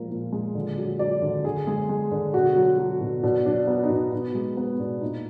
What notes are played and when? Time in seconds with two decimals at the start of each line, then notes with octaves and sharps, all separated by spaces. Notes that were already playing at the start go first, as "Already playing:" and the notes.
Already playing: A#2 F3 G#3 A#4
0.11 A#2
0.32 G#3
0.55 D3
0.78 F#3
0.99 F#3 D5
1.22 D3
1.44 D3 G#4
1.67 G#3 G#4
1.89 G#3
2.12 D3
2.34 B2 F#4
2.56 F#3
2.78 F#3
3.01 B2
3.23 B2 D4
3.46 F#3 D4
3.67 F#3 B3
3.83 D#4
3.90 B2 D4
4.12 B2 B3
4.35 G#3
4.57 G#3 B3
4.80 B2 D4
5.01 A#2 D#4